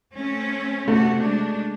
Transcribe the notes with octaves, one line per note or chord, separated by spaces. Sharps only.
A3 C4 C#4
C3 A3 F#4
G#3 D4